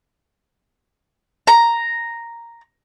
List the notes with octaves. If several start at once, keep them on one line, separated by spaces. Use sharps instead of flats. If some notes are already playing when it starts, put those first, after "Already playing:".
A#5